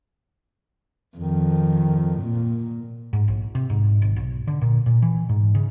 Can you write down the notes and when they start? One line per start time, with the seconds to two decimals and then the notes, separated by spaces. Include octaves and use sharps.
1.17 F2 D#3
2.21 A#2
3.13 G#2
3.28 A#1
3.55 C3
3.70 G#2
4.02 G#1
4.16 B1
4.47 D3
4.62 A#2
4.86 A#2
5.02 E3
5.29 G#2
5.55 C#3